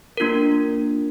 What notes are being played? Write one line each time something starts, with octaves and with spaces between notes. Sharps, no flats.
A#3 D4 F4 A#4